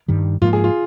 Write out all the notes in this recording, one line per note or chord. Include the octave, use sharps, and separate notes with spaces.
G2 D#3 G3
G#2 F3 A#3 F4
G#4
F4